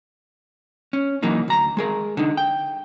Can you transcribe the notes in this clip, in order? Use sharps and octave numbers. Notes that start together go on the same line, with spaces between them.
C#4
E3 F#3 A#3 D#4
D2 A#5
G#3 G#4 A#4
D3 D#4
G5